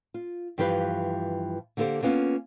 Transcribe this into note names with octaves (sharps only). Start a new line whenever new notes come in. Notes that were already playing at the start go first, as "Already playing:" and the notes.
F4
G2 E3 F3 G4 B4 F5
D3 A#3 G4 A4 C5
A#3 B3 C#4 F4